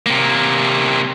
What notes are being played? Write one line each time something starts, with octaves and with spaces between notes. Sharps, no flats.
C3 A#3